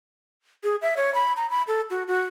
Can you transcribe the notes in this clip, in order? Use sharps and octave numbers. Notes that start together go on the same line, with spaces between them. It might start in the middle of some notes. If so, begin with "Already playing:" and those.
G#4
E5
C#5
B5
A#5
B5
A4
F#4
F#4